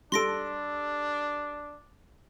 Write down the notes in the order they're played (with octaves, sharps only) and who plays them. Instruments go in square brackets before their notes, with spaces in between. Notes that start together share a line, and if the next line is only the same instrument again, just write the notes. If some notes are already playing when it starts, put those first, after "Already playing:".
[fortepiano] G3 A4 [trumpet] D4 [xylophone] C6 A#6 D7